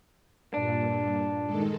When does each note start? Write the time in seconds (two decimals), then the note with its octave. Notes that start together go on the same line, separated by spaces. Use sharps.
0.54 G2 A#2 D4
1.45 D#3 G#3 A4